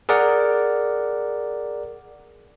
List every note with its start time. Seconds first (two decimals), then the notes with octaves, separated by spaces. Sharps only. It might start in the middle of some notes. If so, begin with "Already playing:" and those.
0.09 G#4 A#4 D5 F#5